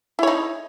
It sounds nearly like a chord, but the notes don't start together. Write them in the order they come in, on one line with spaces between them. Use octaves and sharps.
E4 C#5 D#4